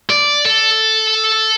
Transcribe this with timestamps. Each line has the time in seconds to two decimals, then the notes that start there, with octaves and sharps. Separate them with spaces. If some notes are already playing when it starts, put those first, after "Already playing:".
0.10 D5
0.45 A4